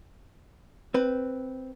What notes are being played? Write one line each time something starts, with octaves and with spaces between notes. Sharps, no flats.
C4 B4